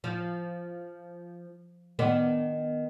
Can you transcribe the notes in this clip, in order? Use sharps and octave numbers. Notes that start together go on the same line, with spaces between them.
F3
D#3 B3 D4